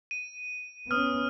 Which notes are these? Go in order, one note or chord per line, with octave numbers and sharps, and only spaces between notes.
D#7
B3 C#4 D#6 F6